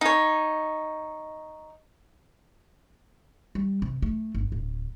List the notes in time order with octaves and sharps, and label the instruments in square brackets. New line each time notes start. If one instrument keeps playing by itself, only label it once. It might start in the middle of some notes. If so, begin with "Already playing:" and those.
[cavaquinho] D#4 C#5
[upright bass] G3
C3
A3
G1
D1